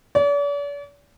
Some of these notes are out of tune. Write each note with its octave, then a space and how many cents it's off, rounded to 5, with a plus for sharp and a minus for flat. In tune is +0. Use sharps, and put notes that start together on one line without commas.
D5 -45